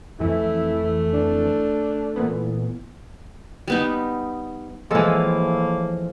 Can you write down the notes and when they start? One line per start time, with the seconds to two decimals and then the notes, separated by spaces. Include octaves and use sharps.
0.20 F2 E3 A3 E4
1.13 D4
2.16 A#2 E3 B3
3.68 G3 B3 D#4
4.91 A2 E3 F3 G#3 A#3 A4 E6